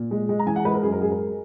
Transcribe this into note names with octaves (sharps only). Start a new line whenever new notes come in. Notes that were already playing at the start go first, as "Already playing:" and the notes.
Already playing: A#2
G#3
G#3
A#5
E3 G#5
F#5
G#3 B4
A#4
F#2 G#4
A#4
G#3 G#4
A#4